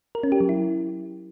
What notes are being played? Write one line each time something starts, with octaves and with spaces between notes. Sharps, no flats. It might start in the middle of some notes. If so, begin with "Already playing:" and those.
A#4
C#4
G4
F#3
E4